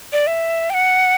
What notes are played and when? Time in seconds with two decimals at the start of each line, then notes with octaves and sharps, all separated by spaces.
0.13 D5
0.27 E5
0.70 G5
0.74 F#5